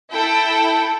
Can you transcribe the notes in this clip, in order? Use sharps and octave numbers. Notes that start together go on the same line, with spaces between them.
E4 A4 G5